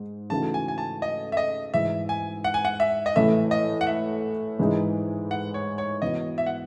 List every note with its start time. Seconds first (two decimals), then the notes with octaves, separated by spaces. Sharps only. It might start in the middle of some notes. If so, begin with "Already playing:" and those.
Already playing: G#2
0.30 C#3 E3 A3 D#4 F#4 A5
0.54 G#5
0.68 G#5
0.78 A5
1.02 D#5
1.32 E5
1.37 D#5
1.73 G#2 E3 G#3 E5
2.09 G#5
2.44 F#5
2.54 G#5
2.65 F#5
2.80 E5
3.06 D#5
3.16 A2 E3 A3 E5
3.51 D#5
3.81 F#5
3.87 E5
4.59 G#2 E3 G#3 D#4
5.31 F#5
5.54 C#5
5.78 C#5
6.02 E3 B3 F#4 D#5
6.38 E5
6.46 F#5